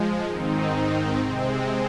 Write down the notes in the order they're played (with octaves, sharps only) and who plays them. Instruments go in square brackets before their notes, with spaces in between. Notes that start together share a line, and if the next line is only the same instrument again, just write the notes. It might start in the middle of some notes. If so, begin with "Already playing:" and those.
Already playing: [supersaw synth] F3 G#3
G#2 D#3 C4 D#4
C3 G#3 C4